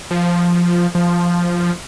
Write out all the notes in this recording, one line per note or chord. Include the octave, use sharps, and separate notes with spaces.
F3
F3